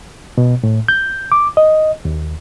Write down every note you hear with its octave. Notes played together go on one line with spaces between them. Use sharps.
B2
A2
G6
D6
D#5
D#2